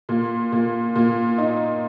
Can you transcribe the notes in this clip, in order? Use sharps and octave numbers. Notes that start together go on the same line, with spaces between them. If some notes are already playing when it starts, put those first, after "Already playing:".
A#2
A#2
A#2
D#4